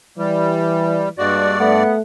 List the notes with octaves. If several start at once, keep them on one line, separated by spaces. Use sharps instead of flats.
E3 G3
G2 G#3 A#3 F#4 D5
A3 B3 F#5